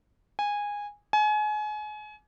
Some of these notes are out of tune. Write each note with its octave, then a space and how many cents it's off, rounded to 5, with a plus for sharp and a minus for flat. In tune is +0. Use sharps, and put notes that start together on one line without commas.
G#5 -15
G#5 +30